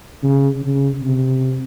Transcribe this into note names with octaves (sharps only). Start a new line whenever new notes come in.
C#3
C#3
C3